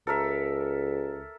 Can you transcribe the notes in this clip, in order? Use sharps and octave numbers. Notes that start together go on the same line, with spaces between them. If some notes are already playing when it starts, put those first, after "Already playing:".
C#2 A4 A#4 E5